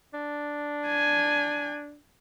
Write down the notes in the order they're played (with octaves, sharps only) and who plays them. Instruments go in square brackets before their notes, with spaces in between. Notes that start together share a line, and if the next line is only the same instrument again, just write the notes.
[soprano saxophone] D4
[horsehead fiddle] G#5